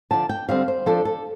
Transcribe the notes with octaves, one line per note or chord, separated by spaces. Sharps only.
D3 F3 D4 A5
G5
D3 G3 C4 F5
C5
F3 D4 A4
A4